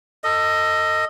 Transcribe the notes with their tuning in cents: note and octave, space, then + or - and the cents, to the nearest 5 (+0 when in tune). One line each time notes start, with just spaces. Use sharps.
A4 +30 D#5 +5